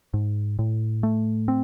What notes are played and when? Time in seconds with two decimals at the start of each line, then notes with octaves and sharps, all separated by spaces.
0.14 G#2
0.59 A2
1.03 A3
1.48 C4